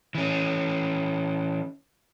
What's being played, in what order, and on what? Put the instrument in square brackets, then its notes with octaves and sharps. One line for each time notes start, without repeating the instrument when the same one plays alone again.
[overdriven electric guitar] E3 C#4